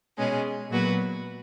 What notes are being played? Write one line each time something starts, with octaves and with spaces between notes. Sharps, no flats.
B2 G#3 C#4 G#4
A#2 F#3 B3 F#4 B4